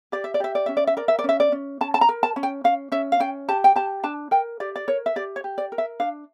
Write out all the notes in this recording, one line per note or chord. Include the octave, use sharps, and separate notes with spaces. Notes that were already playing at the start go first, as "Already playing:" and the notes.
G4 D5
E5
D5
G4 E5
D5
C#4 E5
D5
E5
A#4 D5
E5
D5
C#4 E5
D5
C#4
C#4 A5
A5
A#5
A#4
A5
C#4
G5
C#4 F5
C#4 E5
F5
C#4 G5
G4 A5
G5
G4 A5
D4 A5
A#4 G5
G4 D5
D5
A#4 C#5
E5
G4 D5
C#5
G4
D5
A#4
E5
D4 F5